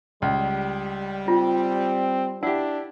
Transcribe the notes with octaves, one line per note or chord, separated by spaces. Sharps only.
C#2 G3
C4 F4
D4 E4 G4 F#5